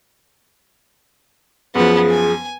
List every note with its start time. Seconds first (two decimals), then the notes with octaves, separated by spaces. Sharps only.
1.75 F#2 F3 B3 G#4
2.11 G#5